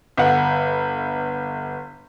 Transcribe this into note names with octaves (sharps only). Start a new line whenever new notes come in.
G1 F#5